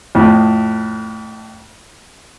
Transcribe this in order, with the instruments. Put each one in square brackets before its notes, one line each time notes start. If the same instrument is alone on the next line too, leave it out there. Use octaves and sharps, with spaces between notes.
[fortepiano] F2 A2